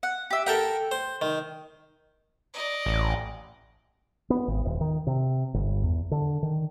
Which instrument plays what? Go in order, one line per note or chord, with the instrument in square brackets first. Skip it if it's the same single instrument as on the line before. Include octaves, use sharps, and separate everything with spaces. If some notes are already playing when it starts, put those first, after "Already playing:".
[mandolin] F#5
G4 E5
[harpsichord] A4 A#4 F#5 [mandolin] G5
[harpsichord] C5
D#3
[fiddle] D5 D#5
[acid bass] A1
[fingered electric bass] B3
G#1
D#1
D#3
C3
G1
E2
D3
D#3